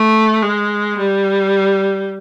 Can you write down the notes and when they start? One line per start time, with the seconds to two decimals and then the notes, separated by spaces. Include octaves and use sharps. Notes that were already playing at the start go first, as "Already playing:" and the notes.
Already playing: A3
0.42 G#3
0.98 G3